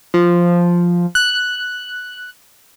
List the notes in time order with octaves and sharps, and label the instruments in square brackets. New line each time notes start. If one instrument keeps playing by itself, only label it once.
[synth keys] F3
F#6